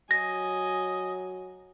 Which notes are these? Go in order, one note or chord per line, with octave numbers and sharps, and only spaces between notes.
F#3 D#5 G#5 A#6